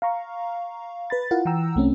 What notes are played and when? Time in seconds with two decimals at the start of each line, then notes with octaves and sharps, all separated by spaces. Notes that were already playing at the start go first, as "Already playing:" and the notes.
0.02 F5 A#5 C#6
1.10 B4 B5 A6
1.31 E4 F4 A#4 F5 F#5
1.45 E3 F#5 G5 A#5 E6
1.75 C2 A3 C4 C#4